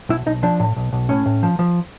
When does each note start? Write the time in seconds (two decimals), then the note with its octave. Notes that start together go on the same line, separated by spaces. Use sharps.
0.09 B1 E4
0.26 B1 D#4
0.43 F3 D4
0.60 A2
0.77 B1
0.93 B1
1.09 A2 C#4
1.26 A2
1.43 F3
1.59 F3